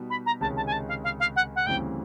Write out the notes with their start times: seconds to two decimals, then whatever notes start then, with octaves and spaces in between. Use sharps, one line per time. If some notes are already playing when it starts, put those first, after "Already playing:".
Already playing: B2 G3 B3 D#4 F#4
0.10 B5
0.26 A#5
0.41 C#2 C3 D#3 G#3 C#4 A5
0.56 A5
0.66 G#5
0.72 A5
0.88 F5
1.04 F5
1.20 F5
1.36 F#5
1.55 F#5
1.66 D2 C#3 E3 G3 C4 G5